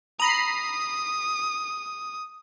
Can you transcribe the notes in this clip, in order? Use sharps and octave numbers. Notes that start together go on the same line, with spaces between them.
A#5 B5 D#6 C7